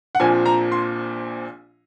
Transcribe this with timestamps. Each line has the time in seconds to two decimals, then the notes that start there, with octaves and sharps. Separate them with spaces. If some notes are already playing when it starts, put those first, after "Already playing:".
0.15 F#5
0.20 A#1 A#2 F3 C4 G#5
0.46 A#5
0.72 C6